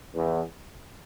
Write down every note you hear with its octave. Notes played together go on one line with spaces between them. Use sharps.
E2